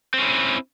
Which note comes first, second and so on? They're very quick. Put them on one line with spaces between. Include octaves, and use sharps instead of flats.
C4 C#4 E4